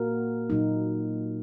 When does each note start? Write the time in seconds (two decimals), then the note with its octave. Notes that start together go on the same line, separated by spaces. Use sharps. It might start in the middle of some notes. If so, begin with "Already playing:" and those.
Already playing: A#2 A#3 F#4 A#4
0.50 A#2 F#3 D#4